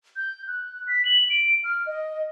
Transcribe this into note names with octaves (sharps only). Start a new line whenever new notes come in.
G6
F#6
B6
F#7
D7
F6
D#5